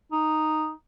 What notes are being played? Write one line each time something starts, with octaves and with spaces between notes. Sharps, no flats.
D#4